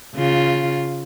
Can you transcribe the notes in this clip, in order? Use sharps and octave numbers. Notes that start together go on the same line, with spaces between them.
C#3 F4